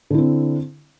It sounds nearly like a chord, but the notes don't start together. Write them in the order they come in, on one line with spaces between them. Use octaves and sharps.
D3 E4 C4